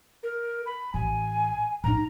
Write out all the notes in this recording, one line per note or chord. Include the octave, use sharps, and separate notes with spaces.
A#4
B5
A1 G#5
A2 D#4 A#5